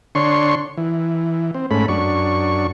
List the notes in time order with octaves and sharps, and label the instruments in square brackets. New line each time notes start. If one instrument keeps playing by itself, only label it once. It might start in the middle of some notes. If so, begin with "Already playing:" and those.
[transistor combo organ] D3 D4 C#5 C6 C#6
E3
C4
G#2 A3 C#4 B5
F#2 D4 C#6